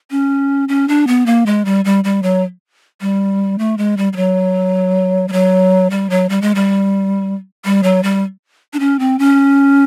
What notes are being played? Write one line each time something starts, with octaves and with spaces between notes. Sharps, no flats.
C#4
C#4
D4
B3
A#3
G#3
G3
G3
G3
F#3
G3
A3
G#3
G3
G3
F#3
G3
F#3
G3
F#3
G3
G#3
G3
G3
F#3
G3
D4
C#4
C4
C#4